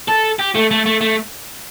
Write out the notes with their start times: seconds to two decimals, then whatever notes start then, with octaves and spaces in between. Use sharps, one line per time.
0.09 A4
0.40 G4
0.55 A3
0.71 A3
0.86 A3
1.01 A3